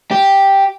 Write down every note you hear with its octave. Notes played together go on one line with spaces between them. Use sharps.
G4